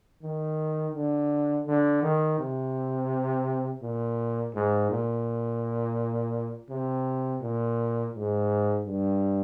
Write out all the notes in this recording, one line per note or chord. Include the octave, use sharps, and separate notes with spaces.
D#3
D3
D3
D#3
C3
A#2
G#2
A#2
C3
A#2
G#2
G2